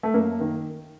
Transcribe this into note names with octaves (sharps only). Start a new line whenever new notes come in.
A3
F#2 A#3
D#3